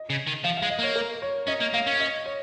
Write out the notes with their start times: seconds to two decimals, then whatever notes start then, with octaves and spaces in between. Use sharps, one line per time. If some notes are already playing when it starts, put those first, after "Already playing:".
Already playing: D#5
0.10 C#3
0.27 D#3
0.44 F3 F5
0.57 G#3 F5
0.70 D#5
0.79 A#3 C#5
0.96 A#4
1.22 C#5
1.48 C#4 D#5
1.61 A#3
1.74 A#3 F5
1.87 C#4
2.00 D#5
2.26 C#5